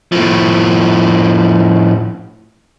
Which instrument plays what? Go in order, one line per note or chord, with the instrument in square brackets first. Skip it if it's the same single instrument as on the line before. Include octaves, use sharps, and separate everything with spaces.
[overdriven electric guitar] A2 F3